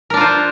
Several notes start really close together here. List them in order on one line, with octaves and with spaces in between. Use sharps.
A#4 D4 F4 C5